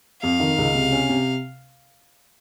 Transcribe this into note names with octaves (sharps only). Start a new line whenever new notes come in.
F2 F5
D#3
C#2
C3
C#4
C3